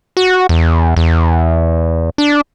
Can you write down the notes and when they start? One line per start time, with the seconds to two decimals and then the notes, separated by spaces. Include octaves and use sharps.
0.17 F#4
0.49 E2
0.97 E2
2.18 D4